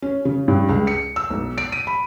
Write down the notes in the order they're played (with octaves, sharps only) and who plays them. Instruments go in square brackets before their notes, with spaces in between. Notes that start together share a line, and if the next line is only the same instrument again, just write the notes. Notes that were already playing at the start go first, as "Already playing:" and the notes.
[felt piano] C#4
C#3
G2
C#2
C#7
E6
B1
D7
D#7
B5